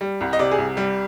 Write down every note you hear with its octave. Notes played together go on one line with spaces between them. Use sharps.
G3
C2
D#5
C3 D5
G#4
C2
G3